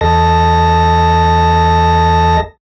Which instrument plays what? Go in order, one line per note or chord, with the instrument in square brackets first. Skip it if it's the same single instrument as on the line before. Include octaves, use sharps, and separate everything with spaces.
[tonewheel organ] E2 A4 D#5 A5 A#6